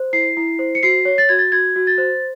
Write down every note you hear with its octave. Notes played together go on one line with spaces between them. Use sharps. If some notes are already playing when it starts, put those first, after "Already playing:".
Already playing: C5
E4 C7
E4
C5
C#7
F#4 C7
C#5
A6
F#4 G#6
A6
F#4 G#6
F#4
A6
C5